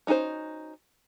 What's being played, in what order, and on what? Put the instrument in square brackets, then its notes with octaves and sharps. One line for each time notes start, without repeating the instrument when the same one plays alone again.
[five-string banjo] C#4 D#4 F#4 A4 C5